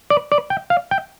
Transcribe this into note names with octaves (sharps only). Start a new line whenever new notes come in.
D5
D5
G5
F5
G5